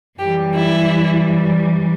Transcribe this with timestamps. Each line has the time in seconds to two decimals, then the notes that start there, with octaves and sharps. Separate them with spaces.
0.18 F#2 E3 G3 G4
0.53 E4